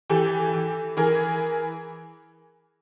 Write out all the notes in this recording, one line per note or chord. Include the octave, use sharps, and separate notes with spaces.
E3 G4 A4
E3
E3 G#4 A#4